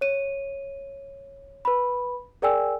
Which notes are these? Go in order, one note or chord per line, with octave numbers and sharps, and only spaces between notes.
C#5 D#7
B4 B5
G#4 A#4 D5 G5 G#5 E6